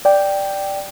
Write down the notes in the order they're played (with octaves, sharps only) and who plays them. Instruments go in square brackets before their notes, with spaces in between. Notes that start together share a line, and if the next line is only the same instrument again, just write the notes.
[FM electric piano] D5 G5